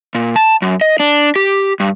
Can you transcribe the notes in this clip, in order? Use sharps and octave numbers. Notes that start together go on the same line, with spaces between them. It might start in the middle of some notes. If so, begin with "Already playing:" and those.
A#2
A5
F#2
D#5
D4
G4
G2